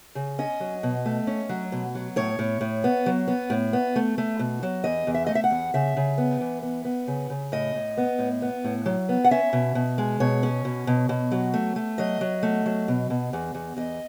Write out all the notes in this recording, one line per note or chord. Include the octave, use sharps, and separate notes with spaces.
C#3
C#4 D#5
F#3
B2
A3
C#4
F#3
B2
F#3
A2 C#5
A2
A2
B3
F#3
B3
A2
B3
A3
A3
B2
F#3
E2 D#5
E2
E5
A3 D#5
E5
F#5
E2
C#3 E5
C#3
B3
E3
B3
B3
C#3
C#3
A2 D#5
A2
B3
A2
B3
A2
F#3
B3
F#5
C#4 E5
B2
B2
G#3
B2 C#5
C#4
B2
B2
B2
F#3
A3
A3
F#3 D#5
F#3
A3
F#3
B2
B2
E2
E2
E2 D#5